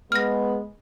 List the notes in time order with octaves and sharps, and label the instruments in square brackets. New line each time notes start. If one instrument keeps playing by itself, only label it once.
[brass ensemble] G#3 [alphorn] B3 [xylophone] F6 A#6